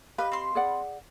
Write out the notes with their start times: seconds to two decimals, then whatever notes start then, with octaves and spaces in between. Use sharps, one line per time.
0.18 G4 B4 D#5 F5 B5
0.32 C4 C6
0.55 G#4 D5 F#5